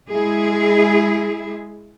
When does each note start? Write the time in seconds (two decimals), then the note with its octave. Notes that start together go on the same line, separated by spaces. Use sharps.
0.10 G#3 E4 G#4